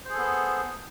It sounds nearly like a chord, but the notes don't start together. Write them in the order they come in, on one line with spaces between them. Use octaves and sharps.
C5 G#4 A4 B3